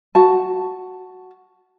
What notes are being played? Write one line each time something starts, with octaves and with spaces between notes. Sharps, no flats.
F#4 A5